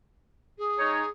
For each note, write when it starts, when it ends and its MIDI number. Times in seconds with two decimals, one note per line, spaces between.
0.58 1.10 68
0.79 1.02 56
0.79 1.02 63
0.79 1.02 73